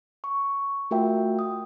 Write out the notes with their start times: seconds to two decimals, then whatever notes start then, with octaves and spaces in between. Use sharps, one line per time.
0.24 C#6
0.91 A3 F4 F#4 A#4 E5 G5
1.39 D#6